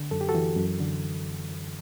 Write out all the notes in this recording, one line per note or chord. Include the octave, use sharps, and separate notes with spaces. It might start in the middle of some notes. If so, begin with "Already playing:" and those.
Already playing: D3
F#2 A4
G4
F#4 A4
E3
F#2
D3